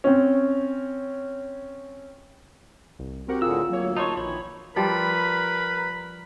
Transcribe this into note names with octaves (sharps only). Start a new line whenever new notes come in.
C4 C#4
C2
C4 F#4 G4 A#4 F#5
A2 D3 F4 G#4 E6
D2 F#3 A#3 C#5
D#4 C#5 A5 C6
A#1 D#3 E3 C#5 B5
F3 G3 A#4 B4 B5